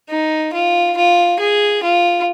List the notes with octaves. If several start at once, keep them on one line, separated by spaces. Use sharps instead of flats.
D#4
F4
F4
G#4
F4